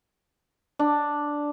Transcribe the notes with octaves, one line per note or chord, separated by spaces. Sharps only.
D4